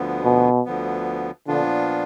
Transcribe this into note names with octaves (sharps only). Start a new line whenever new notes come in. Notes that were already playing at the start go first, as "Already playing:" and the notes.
Already playing: D2 D3 F3 B3
B2
D2 D3 F3 B3
A#2 D3 F3 B3 D4 F4